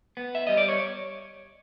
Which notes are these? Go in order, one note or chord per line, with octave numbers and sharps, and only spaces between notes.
B3
E5
G3 D#5
D5
C#5